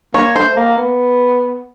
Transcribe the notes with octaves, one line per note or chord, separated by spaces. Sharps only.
A#3 C#5
A3 C5
A#3
B3